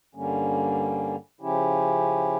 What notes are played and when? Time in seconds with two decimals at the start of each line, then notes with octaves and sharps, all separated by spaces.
0.15 G2 D3 G3 A#3 C#4
1.41 C#3 F3 C#4 E4 G4